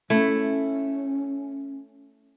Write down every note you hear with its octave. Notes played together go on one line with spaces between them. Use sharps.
A3 C#4 E4